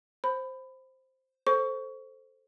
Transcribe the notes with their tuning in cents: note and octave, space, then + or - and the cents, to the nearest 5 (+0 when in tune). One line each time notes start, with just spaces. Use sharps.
C5 +0 B5 +20
A4 +0 C5 +0 C#6 +20